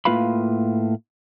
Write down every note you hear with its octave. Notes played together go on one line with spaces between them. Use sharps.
A2 A#3 F4 B4 F5 B5